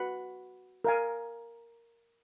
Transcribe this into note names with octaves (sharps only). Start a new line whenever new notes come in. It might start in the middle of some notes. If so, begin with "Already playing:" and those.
Already playing: F#4 B4 F#5 B5
A#4 F5 G#5